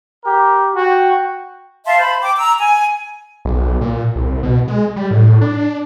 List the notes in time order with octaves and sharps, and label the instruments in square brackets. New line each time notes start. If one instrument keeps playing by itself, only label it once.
[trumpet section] G4 A#4
[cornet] F#4 [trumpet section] G5
[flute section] E5 F5 A5 C6
C5 B5
G5 D6
A#5 E6
G#5
[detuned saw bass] B1
A#2
C2
B2
G#3
G3
A2
D4